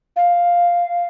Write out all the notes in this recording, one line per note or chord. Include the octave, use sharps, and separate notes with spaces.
F5